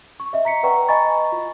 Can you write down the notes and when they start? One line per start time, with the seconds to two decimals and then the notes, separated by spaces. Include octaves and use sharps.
0.20 C#6
0.33 D#5 E5
0.45 A#5 B6 C#7
0.63 B4 D5 F#5 G5 A#5 C#6
0.89 D#5 G#5 A#5 B5 C#6 A6
1.32 F4